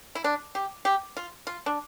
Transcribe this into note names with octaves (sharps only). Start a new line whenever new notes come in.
E4
D4
G4
G4
F4
F4
D4